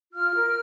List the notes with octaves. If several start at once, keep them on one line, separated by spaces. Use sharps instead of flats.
F4 F6
A#4